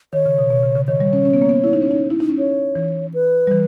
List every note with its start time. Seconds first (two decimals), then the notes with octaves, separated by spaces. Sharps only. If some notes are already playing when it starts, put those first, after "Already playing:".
0.13 D#3 C#5
0.26 C#3
0.38 B2
0.50 B2
0.63 C#3
0.76 C#3
0.88 D#3 C#5
1.00 G3
1.13 C#4
1.25 C#4
1.33 B3
1.42 A#3
1.49 B3
1.64 E4
1.73 D#4
1.82 C#4
1.91 D#4
2.10 E4
2.20 D#4
2.29 C#4
2.39 C#5
2.75 E3
3.14 B4
3.47 G3
3.51 E3